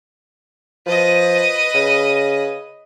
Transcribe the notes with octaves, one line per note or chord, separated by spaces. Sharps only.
F3 B4 D#5
C#3